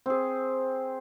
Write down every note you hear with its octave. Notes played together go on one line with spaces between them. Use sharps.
C4 G#4